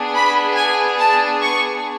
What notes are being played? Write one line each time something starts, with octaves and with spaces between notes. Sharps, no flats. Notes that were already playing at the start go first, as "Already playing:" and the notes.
Already playing: B3 D4 G#4
B5
G#5
A5
C#6